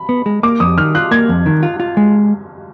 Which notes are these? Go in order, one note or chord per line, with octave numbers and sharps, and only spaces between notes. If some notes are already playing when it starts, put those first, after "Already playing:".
Already playing: B5
B3
G#3
A#3 D6
F2 D#6
D#3 F6
F4 F#6
A#3 G#6
F2
D#3
F4
F4
G#3